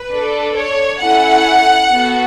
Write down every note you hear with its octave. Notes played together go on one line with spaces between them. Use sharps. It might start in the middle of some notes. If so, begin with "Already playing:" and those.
Already playing: B4
D4 A4
C#5
C#4 E4 A4 F#5
B3 F#4 A4